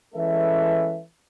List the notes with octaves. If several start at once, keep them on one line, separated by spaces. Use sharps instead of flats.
E3 G#3 C#4 A4 B4 E5